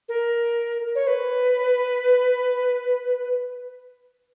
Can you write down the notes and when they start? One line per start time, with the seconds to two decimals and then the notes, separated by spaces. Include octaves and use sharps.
0.09 A#4
0.95 C#5
1.07 B4